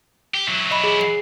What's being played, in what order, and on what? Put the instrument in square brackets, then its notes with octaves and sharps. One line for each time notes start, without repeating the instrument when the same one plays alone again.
[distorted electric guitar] G4
F#3 E4
[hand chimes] D#5 B5
G#4
C7